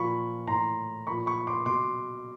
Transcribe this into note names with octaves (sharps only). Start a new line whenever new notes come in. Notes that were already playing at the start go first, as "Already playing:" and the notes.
Already playing: A#2 F3 B5 C#6
A2 E3 A#5 C6
A#2 F3 B5 C#6
B5 C#6
C6 D6
B2 C6 D6